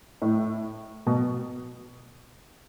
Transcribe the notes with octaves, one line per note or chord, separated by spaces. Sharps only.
A2
B2